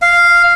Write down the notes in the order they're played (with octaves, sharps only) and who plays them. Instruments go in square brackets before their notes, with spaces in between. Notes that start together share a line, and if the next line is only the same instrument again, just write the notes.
[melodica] F5